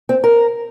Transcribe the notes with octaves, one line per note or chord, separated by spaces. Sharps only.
C4
A#4